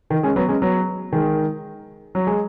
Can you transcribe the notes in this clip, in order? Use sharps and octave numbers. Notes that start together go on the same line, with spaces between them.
D#3
G#3 C#4
F#3 B3
G#3 C#4
F#3 B3
D#3 G#3
F#3
G#3